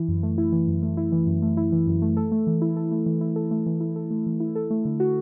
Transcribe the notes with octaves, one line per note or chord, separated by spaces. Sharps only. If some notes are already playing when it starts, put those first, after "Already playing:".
Already playing: E3 E4
F#2
A3
E4
E3
F#2
A3
E4
E3
F#2
A3
E4
E3
F#2
A3
A4
A3
E3
E4
A4
A3
E3
E4
A4
A3
E3
E4
A4
A3
E3
E4
A4
A3
D3
F#4